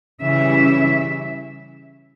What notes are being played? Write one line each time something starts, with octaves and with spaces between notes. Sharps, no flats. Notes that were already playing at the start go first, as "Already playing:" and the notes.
C#3 E3 G3 C#4 E4 E5